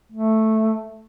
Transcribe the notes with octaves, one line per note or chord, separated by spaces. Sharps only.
A3